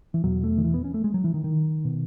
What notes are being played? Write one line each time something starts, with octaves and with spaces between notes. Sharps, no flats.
E3
E2 B2 F#3
A3
D#3
E3
B3
C#4
A3
G#3
F#3
E3
D#3
D#3
B2